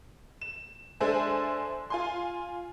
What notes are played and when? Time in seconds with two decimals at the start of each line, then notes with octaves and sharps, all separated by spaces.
0.41 E7
1.00 G#3 D4 A4 C5 E5 G#5
1.90 F4 G#5 C6